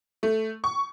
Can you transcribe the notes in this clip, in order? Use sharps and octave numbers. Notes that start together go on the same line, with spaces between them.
A3
C#6